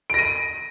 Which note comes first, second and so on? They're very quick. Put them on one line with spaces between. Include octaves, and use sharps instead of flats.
D7 A#6 D#7